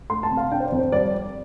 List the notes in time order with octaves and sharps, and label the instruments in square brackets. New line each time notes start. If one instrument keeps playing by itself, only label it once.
[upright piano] A3 C6
A5
C3
F5
D4 G5
C5
D5
F2
C5
G3 D5